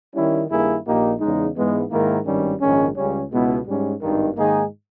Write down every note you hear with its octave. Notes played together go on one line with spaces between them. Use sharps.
D#3 G3 C#4 E4
G2 D#3 A#3 E4 G#4
A#1 A#2 A#3 D#4 G4
E2 C#3 G#3 D#4
G#2 E3 G#3 B3
G#2 D#3 A#3 E4 A#4
G#1 G2 D#3 G3 C#4
A#1 G#2 D#3 G#3 C#4
C#2 C#3 G3 C#4
C#2 B2 G#3 B3 E4
G#2 G3 C#4
G#1 G2 D#3
G#2 D#3 A#3 D#4 G#4